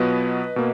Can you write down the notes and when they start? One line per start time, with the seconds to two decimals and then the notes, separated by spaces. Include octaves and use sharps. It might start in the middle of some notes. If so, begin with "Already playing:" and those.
Already playing: B2 F#3 B3 F4 B4 D#5
0.56 B2 A#3